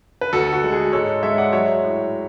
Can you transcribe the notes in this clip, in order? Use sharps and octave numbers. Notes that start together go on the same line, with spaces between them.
B4
D2 F#4 A4
F#4
G#3
G#4
G#2 A4 C#5
G#3 C#5 E5
D5 F#5
F#3 C#5 E5
A2